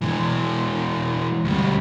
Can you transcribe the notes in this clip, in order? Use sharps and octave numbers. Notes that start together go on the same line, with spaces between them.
E3 G#3
D2 G3